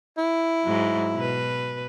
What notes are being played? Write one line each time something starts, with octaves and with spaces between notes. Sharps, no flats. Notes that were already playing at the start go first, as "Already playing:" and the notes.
E4
G#2 F#3
B2 B4